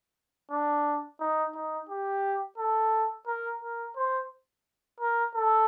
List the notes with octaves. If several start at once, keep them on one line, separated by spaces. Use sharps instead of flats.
D4
D#4
D#4
G4
A4
A#4
A#4
C5
A#4
A4